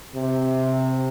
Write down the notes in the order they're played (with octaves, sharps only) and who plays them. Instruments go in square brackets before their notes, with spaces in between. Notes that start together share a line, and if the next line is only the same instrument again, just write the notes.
[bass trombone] C3